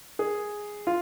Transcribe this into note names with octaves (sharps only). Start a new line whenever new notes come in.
G#4
F4